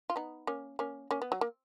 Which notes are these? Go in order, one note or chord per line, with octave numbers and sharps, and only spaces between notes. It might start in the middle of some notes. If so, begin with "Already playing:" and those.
F4
B3 D#4
A#3 C#4
A#3 C#4
A#3 C#4
B3
F#3
A#3